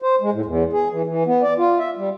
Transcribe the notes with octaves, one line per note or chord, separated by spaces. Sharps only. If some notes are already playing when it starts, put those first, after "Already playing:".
C5
G#3
A2
E2
G#4
E3
E3
B3
D5
F4
E5
G3